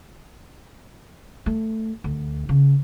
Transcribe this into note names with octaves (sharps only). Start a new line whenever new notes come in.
A3
D2
C#3